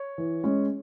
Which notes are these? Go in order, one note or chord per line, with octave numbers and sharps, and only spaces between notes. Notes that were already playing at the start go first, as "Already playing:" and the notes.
Already playing: C#5
E3
G#3 C#4